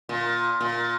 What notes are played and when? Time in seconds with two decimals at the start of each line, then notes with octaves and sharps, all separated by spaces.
0.09 A#2
0.61 A#2